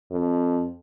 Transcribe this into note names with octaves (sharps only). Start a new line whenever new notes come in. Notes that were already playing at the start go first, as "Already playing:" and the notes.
F2